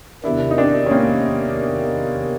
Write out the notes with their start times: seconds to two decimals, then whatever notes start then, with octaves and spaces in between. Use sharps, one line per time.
0.24 E2 C3 D#3 D4 E4
0.51 D#4
0.58 C4 D4
0.86 C#4
0.91 A#3 C4